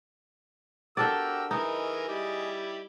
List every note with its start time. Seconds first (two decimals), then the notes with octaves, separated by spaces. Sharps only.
0.97 D4 F#4 G4 A4 A#4 D5 G5 E6
1.51 E3 D#4 G#4 A#4 D#5
2.08 G3 E4 G4